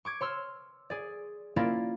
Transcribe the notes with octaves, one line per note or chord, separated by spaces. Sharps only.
C#6 D6 G#6
C#5 C6 E6 F6
G#4 D5
A#3 C#4 E4 F4 D5